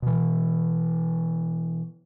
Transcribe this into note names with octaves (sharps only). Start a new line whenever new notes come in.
B2 E3